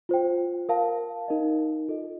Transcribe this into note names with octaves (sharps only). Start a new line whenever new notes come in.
F4 C5 G5
A#4 F5 A5
D#4 A#4 D#5
F4 A4 D#5